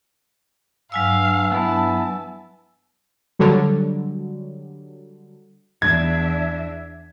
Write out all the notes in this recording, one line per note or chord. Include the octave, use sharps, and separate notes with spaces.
G2 F#3 F5 G#5 E6
B3 E4 A5
D3 F#3 G3
E2 D4 E5 G#6